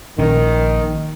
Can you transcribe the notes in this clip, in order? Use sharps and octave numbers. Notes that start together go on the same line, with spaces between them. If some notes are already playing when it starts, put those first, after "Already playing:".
A#1 D#3 C#4